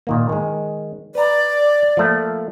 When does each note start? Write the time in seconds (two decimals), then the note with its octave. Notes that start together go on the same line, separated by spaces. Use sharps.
0.07 A#2 D#3 A#3
0.29 D#3 G#3
1.15 B4 D5 A#5
1.97 F3 A3 A#3